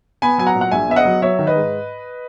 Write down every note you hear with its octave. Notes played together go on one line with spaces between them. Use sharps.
B3 G#5 B5
F#3 G#5
F#5 A#5
A#2
F#5
A#1 E5 G#5
B3 E5
D#5 F#5
F#3
F#3 C#5 E5
D#3
B4 D#5
G#2